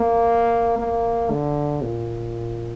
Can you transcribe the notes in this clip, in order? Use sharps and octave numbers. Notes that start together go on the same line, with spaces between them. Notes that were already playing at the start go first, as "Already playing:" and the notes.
Already playing: A#3
A#3
D3
A#2